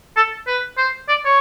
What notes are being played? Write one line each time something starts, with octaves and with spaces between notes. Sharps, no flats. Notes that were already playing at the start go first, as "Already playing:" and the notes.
A4
B4
C5
D5
C#5